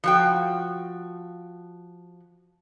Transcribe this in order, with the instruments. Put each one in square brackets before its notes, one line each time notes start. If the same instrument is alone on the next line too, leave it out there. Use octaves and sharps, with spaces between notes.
[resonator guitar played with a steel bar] F3 F#4 G5